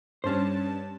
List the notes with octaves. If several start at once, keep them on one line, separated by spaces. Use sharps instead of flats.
G2 C#4 C5 A5